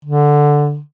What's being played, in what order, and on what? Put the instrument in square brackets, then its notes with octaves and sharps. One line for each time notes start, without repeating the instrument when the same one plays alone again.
[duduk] D3